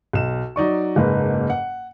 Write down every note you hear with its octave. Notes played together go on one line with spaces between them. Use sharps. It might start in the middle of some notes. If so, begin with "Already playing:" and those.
B1 E7
F#3 D#4 D5 C#6
F#1 G#2 A#3 B4
F#5